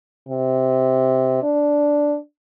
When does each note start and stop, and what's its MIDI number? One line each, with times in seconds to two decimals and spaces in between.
0.29 1.38 48
1.43 2.16 62